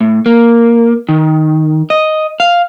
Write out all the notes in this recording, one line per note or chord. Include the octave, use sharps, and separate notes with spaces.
A2
A#3
D#3
D#5
F5